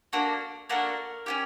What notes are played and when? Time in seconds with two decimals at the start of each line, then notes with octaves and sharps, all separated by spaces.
0.13 A#3 D4 F#4 A4
0.69 A#3 D4 F#4 A4 A#4
1.26 C#4 E4 G4